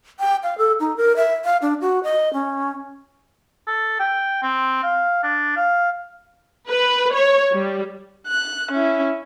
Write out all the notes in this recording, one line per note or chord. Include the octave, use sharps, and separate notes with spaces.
G5
F5
A4
D#4
A#4
E5
F5
D4
F#4
D#5
C#4
A4
G5
C4
F5
D4
F5
B4
C#5
G3
F#6
C#4 E4